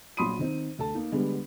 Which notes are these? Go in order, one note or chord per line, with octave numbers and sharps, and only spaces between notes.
A#1 F#3 B5 C6 D#6 D#7
D#3 C4 D#4
D2 A4 A5
A#3 D#4
D3 G3 G#3 B3